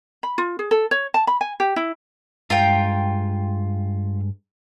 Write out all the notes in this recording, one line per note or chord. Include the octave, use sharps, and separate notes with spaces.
B5
F4
G#4
A4
C#5
A5
B5
G#5
G4
E4
G2 G#3 F4 G5 A#5